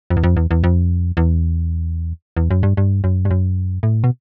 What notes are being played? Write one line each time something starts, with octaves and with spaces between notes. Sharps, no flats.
F2
E2
F2
E2
E2
F2
E2
E2
F#2
G2
G2
F#2
G2
F#2
A2
B2